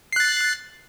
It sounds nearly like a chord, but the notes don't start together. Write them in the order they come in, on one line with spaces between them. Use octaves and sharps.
C7 F#6 A6